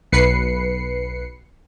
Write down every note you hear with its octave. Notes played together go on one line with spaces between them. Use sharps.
B1 B4 C7 C#7